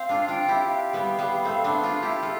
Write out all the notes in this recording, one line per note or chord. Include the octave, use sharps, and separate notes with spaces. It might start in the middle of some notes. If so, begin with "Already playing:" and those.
Already playing: C4 F5
D4 F4
D4 F4 G5
E4 G4
F5
G3 B3
G3 B3
A3 C4
B3 D4
D4 F4
E4 G4
F4 A4